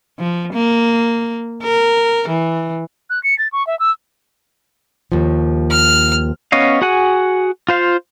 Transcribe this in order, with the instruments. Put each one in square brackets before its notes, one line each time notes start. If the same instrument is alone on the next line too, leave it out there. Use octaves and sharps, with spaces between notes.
[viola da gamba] F3
A#3
A#4
E3
[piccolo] F#6
C#7
A6
C#6
E5
E6
[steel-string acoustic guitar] D#2 F3
[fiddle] F6
[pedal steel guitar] B3 C#4 C#5 D#5 F5
F#4 G#4 F#5 G#5
F4 C5 F5